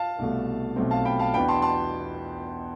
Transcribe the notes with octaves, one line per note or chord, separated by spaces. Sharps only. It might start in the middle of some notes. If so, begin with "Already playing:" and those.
Already playing: F5 A5
C2 B2 A3
B1 B2 A3 C4
F5 A5
G5 B5
F5 A5
E2 B2 B3 D4 G5 B5
A5 C6
A5 C6